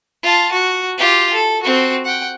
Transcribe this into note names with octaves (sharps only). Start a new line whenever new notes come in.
F4 A5
F#4
F4 G4
A4
C4 F#4
F#5 G5